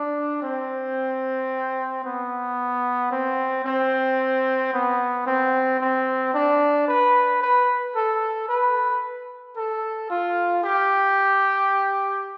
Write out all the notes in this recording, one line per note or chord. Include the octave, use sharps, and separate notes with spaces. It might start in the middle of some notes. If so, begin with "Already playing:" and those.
Already playing: D4
C4
B3
C4
C4
B3
C4
C4
D4
B4
B4
A4
B4
A4
F4
G4